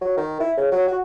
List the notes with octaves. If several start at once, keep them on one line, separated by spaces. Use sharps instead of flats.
F#3
D#3
E4
C#3
F#3
F#4